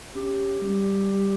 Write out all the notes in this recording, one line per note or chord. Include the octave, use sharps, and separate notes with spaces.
C#4 G4
G3